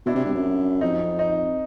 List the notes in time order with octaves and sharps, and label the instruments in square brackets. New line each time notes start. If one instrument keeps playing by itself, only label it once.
[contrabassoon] B2 [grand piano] D4 E4
[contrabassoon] C3
G2
F#2
[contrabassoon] F2 [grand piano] D#4
[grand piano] D#4